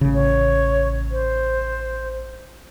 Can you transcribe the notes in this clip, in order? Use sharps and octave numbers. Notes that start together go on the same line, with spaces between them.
A1 C#3
C#5
C5